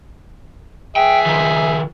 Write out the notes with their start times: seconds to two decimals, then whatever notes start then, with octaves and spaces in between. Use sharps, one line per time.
0.96 G#4 E5 G5
1.26 D#3 F3